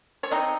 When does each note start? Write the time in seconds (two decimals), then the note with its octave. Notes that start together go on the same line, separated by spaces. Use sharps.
0.23 C#5
0.31 C4 D#4 D#5